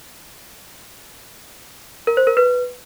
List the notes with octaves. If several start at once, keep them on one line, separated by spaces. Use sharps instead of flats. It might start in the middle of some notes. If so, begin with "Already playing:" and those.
A#4
C5
A#4
B4